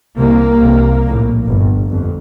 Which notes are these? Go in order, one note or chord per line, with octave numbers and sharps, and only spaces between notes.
C2 C3 A#3
C2 C3
A#1 A2
G1 G2
G1 F2